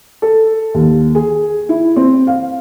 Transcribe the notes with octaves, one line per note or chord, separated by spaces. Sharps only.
A4
D#2
G#4
E4
C4
F5